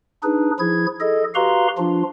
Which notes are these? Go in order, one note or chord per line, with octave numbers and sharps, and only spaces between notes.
D4 D#4 G#4 B4
F3 E4 G#4 G#6
G#4 A4 D#5
F#4 G4 B4 F5 A#5 C6
F3 D4 F4